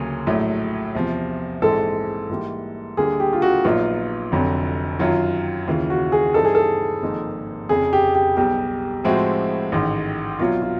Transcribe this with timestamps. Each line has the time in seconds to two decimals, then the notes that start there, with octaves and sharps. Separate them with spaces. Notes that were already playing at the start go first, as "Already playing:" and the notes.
Already playing: D2 C#3 F#3 A#3 C#4 G#4
0.27 A#1 A2 F#3 A3
0.95 E2 C3 F3
1.62 A#1 G#2 E3 G#3 C4 A4
2.30 G#2 E3 G3 A#3
2.97 D2 D3 G3 A#3 D4 G#4
3.20 G4
3.33 F4
3.42 F#4
3.64 A#1 A#2 F#3 B3 D#4 F4
4.32 F1 F2 D3 F#3
4.99 F#2 D#3 F#3 F4
5.67 D#2 C#3 E3 F4
5.90 F#4
6.12 G#4
6.34 G2 E3 G3 C4 D#4 A4
6.45 G#4
6.55 A4
7.02 G#1 G#2 F3 A#3 D#4
7.69 F1 F2 C#3 G#4
7.93 G4
8.15 G4
8.37 B1 B2 G3 G4
9.04 A2 F3 G#3 C4 E4 F#4
9.72 A1 G#2 D#3
10.39 C2 B2 F#3 F4
10.62 F4